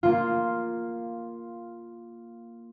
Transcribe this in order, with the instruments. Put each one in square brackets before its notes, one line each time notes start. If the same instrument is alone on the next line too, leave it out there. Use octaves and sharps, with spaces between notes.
[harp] A#3 F4